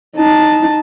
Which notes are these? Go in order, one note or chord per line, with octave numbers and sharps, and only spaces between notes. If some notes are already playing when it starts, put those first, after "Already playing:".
D#4 A5